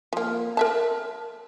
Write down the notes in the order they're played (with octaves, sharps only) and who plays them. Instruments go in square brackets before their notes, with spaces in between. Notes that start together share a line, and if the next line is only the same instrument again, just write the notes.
[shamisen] F3 A#3
A#4 E5 A5